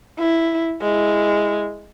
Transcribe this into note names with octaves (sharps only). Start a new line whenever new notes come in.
E4
G#3 E4